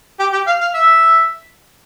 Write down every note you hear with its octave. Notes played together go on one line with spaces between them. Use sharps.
G4
G4
F5
F5
E5